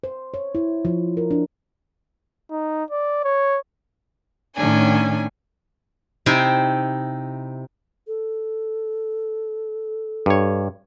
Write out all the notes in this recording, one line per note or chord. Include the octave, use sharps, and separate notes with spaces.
C5
C#5
E4
F3
A#4
D4
D#4
D5
C#5
A2 D#3 C#4 D4 G#5
C3 C4 D#4 E4 G5 G#5
A4
G2 C#5